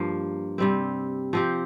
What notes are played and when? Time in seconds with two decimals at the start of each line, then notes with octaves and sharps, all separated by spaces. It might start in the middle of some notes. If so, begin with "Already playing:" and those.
Already playing: G2 F3 A#3
0.58 C3 G3 C4
1.33 F3 C4 G4